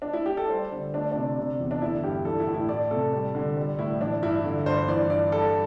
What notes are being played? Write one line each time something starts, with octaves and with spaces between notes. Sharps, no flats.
D4
E4
G4
A4
G3 C5
D3
A3 D4
C3 D4
C3
E2
D4
D3 E4
G2 G4
E3 A4
E4
A2
E4
A3 D5
C3 A4
G3
D3
G3
A2 E4
E3 D4
G2 E4
D3
G2 C5
E3 D5
G2 D5
G3 A4